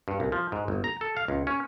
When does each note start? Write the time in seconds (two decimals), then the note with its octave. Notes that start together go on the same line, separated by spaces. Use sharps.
0.08 G2
0.20 C2
0.32 F3
0.52 G#2
0.68 G1
0.84 A#5
1.01 A4
1.17 F5
1.28 C#2
1.47 C#4